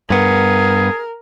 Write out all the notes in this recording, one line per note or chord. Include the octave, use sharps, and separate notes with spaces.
G2 B3 G#4 A#4